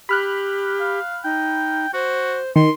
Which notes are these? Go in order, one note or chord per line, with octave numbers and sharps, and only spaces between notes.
G4 B5 F6 F#6
F5
D#4 G5
F#4 C5
D#3 C6